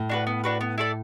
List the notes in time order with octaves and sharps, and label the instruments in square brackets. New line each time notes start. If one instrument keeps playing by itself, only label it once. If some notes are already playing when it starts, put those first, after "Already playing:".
Already playing: [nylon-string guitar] A2
[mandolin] D4 F#4 B4
B3
D4 F#4 B4
B3
E4 A4 D5